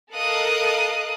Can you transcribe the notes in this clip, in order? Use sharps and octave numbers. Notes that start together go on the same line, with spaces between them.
A4 A#4 D#5 F5 D#6 F#6